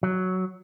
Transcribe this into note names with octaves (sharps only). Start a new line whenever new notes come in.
F#3